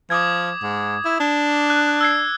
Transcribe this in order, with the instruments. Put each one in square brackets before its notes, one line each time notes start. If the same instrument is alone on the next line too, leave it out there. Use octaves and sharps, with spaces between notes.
[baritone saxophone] F3 [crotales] D6 D#6 G#6
[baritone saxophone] G#2
E4
D4
[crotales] F#6
E6 G#6 C7